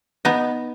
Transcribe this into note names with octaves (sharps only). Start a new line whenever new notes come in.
B3 D#4